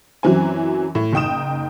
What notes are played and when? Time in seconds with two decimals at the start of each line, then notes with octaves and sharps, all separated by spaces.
0.23 F#2 E3 F#3 C4 G#5
0.95 A2
1.13 F#1 D#4 G5 D#6 E7